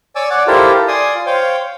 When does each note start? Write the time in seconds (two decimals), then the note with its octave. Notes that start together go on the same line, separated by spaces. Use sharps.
0.16 C#5 D5 G#5 D6 E6
0.30 C#5 D5 F#5 D6
0.47 E4 F4 G4 A4 A#4 C5
0.88 D5 G#5 C6 D#6
1.14 F4
1.26 C5 C#5 F5 G5